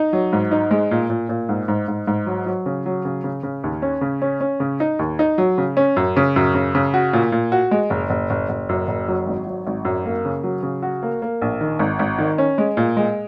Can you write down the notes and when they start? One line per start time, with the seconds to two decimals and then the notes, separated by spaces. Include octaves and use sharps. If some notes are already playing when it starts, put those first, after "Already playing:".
Already playing: D#4
0.13 F#3
0.33 G#2
0.51 D#4
0.71 G#3
0.91 A#2
1.10 A#2
1.29 A#2
1.49 G#2
1.68 G#2
1.88 G#2
2.07 G#2
2.27 F#3
2.46 F#3
2.66 C#3
2.86 F#3
3.05 C#3
3.24 C#3
3.43 C#3
3.64 D#2
3.82 C#4
4.01 C#3
4.22 C#4
4.41 C#4
4.60 C#3
4.80 D#4
4.99 D#2
5.19 D#4
5.38 F#3
5.58 C#3
5.77 C#4
5.97 F#2
6.16 C#3
6.36 F#2
6.55 C#3
6.75 C#3
6.94 F#4
7.13 A#2
7.32 A#2
7.52 F#4
7.71 G#3
7.90 F#1
8.10 F#1
8.30 F#1
8.49 F#1
8.69 F#2
8.88 F#1
9.08 F#3
9.26 G#1
9.47 F#3
9.67 G#1
9.85 F#2
10.05 A#3
10.25 C#3
10.43 F#3
10.63 C#3
10.83 F#4
11.03 A#3
11.22 A#3
11.42 A#1
11.61 D#3
11.79 G#1
11.99 G#1
12.18 D#3
12.38 C#4
12.58 G#3
12.77 A#2
12.97 G#3